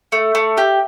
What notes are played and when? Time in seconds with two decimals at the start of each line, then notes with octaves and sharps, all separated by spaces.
0.12 A3
0.35 A3
0.57 G4